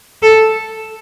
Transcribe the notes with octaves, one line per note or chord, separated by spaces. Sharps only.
A4